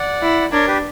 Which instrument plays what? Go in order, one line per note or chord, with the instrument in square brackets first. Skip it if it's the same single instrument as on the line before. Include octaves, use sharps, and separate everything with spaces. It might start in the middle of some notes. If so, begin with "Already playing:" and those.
Already playing: [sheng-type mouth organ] D5 F#5
[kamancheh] E4
[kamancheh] D4 [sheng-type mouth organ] A#4 C#5
[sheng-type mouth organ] G4 B4